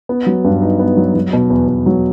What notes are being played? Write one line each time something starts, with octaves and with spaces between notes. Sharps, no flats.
B3
F#3
G2
D#4
B3
F#3
F#3
B2
E2
E2
F#3